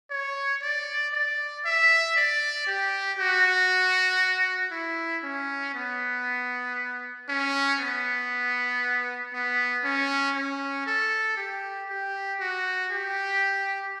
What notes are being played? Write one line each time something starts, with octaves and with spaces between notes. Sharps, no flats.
C#5
D5
D5
E5
D5
G4
F#4
E4
C#4
B3
C#4
B3
B3
C#4
C#4
A4
G4
G4
F#4
G4